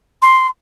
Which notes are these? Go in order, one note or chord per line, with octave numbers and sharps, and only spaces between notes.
C6